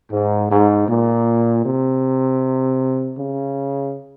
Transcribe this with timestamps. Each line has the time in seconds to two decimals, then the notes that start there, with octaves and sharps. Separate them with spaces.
0.10 G#2
0.50 G#2
0.88 A#2
1.65 C3
3.19 C#3